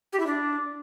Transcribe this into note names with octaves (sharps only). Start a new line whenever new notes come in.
G4
E4
D4